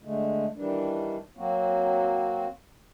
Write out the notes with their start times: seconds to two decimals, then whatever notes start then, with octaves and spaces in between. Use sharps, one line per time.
0.03 D3 G#3 A3
0.56 D#3 E3 G3 D4
1.37 F#3 A#3 C4 F#4